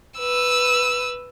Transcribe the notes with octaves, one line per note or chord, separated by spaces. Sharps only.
B4 E6